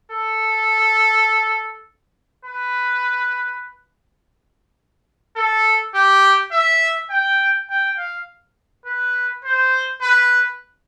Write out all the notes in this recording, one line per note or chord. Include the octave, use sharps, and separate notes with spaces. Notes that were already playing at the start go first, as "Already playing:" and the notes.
A4
B4
A4
G4
E5
G5
G5
F5
B4
C5
B4